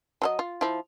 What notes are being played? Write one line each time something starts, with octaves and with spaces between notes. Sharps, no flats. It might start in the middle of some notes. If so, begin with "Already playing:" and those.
F#3 A4 D#5
F4
F3 E4